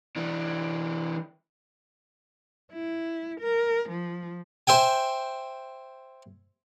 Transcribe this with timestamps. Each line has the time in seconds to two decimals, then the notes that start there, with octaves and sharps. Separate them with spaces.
0.16 E3 D4
2.72 E4
3.41 A#4
3.89 F3
4.67 C5 E5 G5 G#5